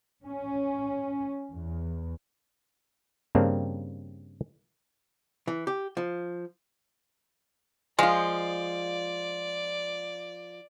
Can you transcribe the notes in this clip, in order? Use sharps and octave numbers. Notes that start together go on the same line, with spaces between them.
C#4
E2
G2 C#3 A#3 C4 D4
E3
G4
F3
F3 G#3 F4 D5